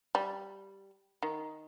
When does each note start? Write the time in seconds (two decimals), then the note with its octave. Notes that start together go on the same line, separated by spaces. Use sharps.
0.15 G3
1.23 D#3